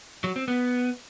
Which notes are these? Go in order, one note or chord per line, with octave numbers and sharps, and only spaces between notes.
F#3
C4
B3